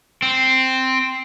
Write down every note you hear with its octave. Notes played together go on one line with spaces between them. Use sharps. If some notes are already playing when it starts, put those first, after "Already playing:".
C4